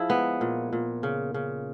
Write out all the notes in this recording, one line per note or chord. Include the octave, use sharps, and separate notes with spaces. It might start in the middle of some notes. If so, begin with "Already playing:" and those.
Already playing: F3 E4 G#4
G#3 B3
A#2
A#2
C#3
C#3